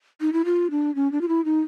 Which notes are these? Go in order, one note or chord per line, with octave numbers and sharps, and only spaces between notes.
D#4
E4
F4
D4
C#4
D4
F4
E4
D#4